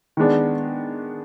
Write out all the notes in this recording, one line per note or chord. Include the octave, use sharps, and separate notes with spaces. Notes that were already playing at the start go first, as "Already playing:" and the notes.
D#3 G#3 B3 D4